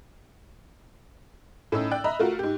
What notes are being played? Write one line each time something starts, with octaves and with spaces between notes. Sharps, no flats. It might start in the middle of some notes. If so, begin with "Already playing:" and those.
A2 C#4 D#4 E6
D5 G5 F#6
D#5 E5 A#5 B5
A3 F4 F#4 A#4
G#2 G4